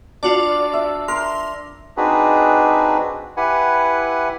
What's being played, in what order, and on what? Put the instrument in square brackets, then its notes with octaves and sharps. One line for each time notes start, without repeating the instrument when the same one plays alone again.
[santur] D4 [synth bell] F4 F#4 D5
[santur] E5
[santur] A#4 [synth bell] C6 F7
[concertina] C4 D4 D#4 F#4 G#4 B4
E4 G4 B4 F#5 G#5